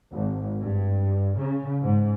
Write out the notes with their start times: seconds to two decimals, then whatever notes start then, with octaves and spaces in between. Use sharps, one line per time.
0.11 G#1
0.63 G2
1.37 C#3
1.83 G#2